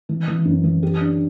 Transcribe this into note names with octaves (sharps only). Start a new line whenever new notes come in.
E3
E3
F#2
E3
G4
D4